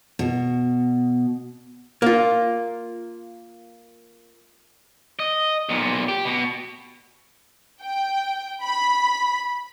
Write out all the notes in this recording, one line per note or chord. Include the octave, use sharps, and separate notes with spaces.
B2
A#3 F4
D#5
B1 A#2
G4
B2
G5
B5